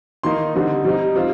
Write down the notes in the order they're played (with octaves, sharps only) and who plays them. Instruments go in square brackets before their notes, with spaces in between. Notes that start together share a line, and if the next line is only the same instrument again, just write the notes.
[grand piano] D#3 A#3 D#4 C6
D3 G3 C4 D#4
G3 C4 D#4
G3 C4 F4